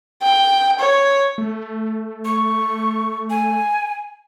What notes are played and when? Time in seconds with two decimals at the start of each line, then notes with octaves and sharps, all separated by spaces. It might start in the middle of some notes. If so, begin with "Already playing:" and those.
0.23 G5
0.79 C#5
1.38 A3
2.25 C#6
3.30 G#5